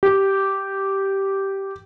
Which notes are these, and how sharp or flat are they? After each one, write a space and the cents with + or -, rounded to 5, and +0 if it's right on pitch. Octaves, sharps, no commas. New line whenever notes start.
G4 -10